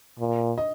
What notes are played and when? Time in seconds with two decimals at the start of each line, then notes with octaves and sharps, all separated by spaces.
0.19 A#2
0.58 D#5